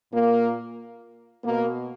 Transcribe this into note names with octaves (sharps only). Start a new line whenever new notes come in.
A#2 A#3
B2 A#3